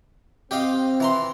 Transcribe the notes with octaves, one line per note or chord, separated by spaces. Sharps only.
C4 G4 D#5 F5
E3 A#5 C6